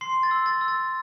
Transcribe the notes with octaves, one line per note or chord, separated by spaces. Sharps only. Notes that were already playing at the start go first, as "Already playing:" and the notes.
C6 C7
A6
E6
A6
E6
A6